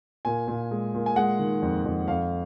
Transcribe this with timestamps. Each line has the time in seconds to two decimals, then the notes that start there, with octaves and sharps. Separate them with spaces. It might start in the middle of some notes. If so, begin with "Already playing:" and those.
0.25 A#2 G#5
0.48 A#2
0.71 G#3
0.94 A#2
1.06 G#5
1.16 G#3 F#5
1.39 D#3
1.62 F2
1.85 F2
2.08 F2 F5